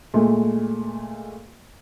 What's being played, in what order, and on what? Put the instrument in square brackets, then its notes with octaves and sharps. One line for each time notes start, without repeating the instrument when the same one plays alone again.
[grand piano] A#2 G#3 A3